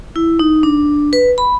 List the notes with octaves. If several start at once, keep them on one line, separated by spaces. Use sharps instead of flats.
E4
D#4
D4
B4
B5